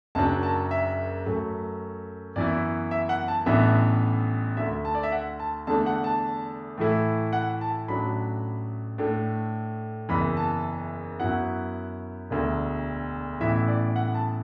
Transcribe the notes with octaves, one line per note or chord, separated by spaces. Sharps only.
F#1 F#2 F#3 D4 A5
A5
E5
F#2 F#3 A3
F#2 E3 B3 E4 D5
E5
F#5
A5
A1 A2 E3 B3 D4 E5
D2 D3 A3 E5
A5
D5
E5
F#5
A5
E2 D3 A3 D4 A5
F#5
A5
A2 E3 A3 E4
F#5
A5
A1 A2 F#3 D4 B5
A2 A3 D4
F#1 E2 E3 B5
A5
F#2 F#3 B3 E4 F#5
E1 D2 D3
A1 A2 E3 B3 E4 E5
D5
F#5
A5